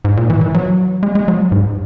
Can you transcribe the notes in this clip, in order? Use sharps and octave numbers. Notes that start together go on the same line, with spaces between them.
G#2
A#2
E3
E3
F#3
G#3
G#3
F#3
G#2